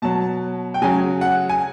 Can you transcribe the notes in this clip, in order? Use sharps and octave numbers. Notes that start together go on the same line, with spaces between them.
B2 F#3 A5
G5
C#3 F#3 G#5
F#5
G#5